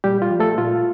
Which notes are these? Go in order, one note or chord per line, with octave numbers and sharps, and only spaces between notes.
A#2 G3 G4
F4
F3
A3 A4
A#2 F4